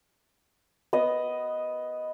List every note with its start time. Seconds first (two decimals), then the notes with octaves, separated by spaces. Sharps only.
0.93 B3 D#5